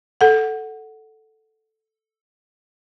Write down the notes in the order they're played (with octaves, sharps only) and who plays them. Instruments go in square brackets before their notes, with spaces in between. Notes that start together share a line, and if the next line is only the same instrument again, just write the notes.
[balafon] A4 F#5